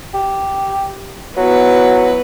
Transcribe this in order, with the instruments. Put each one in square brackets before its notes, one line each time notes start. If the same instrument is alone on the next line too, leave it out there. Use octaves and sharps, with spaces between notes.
[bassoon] G4
[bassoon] F#3 [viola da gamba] B3 E4 B4